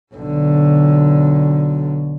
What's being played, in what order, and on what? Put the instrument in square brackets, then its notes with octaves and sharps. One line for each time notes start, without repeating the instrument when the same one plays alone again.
[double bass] B1 D3